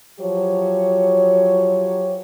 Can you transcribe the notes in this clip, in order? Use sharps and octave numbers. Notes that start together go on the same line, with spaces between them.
F3 F#3 G4 C#5